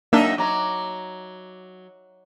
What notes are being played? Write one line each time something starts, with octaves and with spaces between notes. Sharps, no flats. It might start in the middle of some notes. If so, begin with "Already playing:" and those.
F#2 A#3 D4 D#4 E5
F#3 C#5 A#5 D6